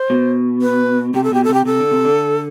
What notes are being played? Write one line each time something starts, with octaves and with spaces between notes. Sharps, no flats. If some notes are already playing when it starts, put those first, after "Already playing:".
Already playing: C5
B2
B4
C3 G4
A4
B2 G4
A4
C3 G4
C3 A4
D3
C3
D3